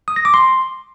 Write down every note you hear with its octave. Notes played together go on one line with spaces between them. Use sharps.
D#6
A#6
D6
C6